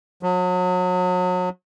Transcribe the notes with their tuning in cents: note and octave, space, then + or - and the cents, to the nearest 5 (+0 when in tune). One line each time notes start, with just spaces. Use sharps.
F#3 -35